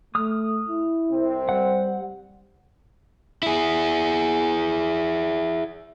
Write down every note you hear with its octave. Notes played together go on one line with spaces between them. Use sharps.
A3 D#6 F6
E4
C2 C3 C4
G3 F#5
E4 G#4